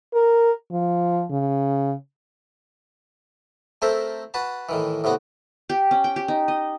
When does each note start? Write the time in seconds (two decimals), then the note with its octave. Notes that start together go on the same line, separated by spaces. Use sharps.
0.14 A#4
0.72 F3
1.31 C#3
3.82 A3 C4 A4 A#4 C5 E5
4.34 F#4 B4 A5
4.69 A2 D#3 E3
5.04 A2 C3 B3 F#4
5.69 G4
5.91 C#4
6.04 G5
6.16 G4
6.28 D#4
6.48 D#5